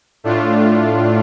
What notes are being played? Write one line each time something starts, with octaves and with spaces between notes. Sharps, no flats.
A2 A3 D4 F4